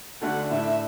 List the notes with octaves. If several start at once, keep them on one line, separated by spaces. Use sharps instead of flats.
D2 D3 A3 D4 F#4 F#5
A2 A3 D4 E5